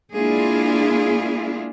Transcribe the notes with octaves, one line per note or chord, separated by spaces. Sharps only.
G#3 A#3 D4 E4 F4 G#4